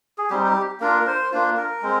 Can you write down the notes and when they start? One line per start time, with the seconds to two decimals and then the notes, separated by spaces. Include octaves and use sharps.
0.18 G#4
0.30 G3 C4 D#4 G4
0.47 G4
0.80 A#3 D4 F4 A#4
1.00 A#4
1.07 C5
1.32 A#3 D4 F4
1.57 A#4
1.83 G#3 C4